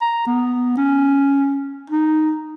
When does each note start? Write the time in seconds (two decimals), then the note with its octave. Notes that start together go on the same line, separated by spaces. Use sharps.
0.02 A#5
0.27 B3
0.77 C#4
1.90 D#4